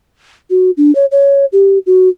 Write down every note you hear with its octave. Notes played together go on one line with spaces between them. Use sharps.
F#4
D4
C#5
C#5
G4
F#4